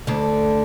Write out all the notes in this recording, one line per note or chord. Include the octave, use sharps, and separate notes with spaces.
D2 D3